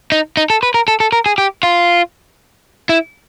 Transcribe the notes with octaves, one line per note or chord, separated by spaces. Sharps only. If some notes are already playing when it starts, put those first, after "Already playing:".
D#4
D#4
A4
B4
A#4
A4
A4
A#4
G#4
G4
F4
E4